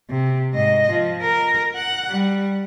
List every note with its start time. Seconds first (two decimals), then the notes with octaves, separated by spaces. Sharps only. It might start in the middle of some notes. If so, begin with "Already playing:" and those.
0.10 C3
0.53 G#2 D#5
0.91 F3
1.21 A#4
1.76 F#5
2.09 G3